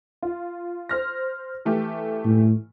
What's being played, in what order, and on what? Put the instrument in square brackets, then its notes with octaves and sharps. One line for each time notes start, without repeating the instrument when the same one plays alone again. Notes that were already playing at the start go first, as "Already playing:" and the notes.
[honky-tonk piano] F4
C5 F6 A#6
E3 A3 G4
[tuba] A2